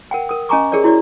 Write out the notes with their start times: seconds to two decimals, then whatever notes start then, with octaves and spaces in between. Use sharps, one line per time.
0.11 A#4 F#5 G5
0.29 A#4 D#6
0.49 C#4 D#5 G#5 A#5 C#6 D6
0.72 G4 G#4 A#4 C#5 D5
0.84 E4 F#4 C#5 D5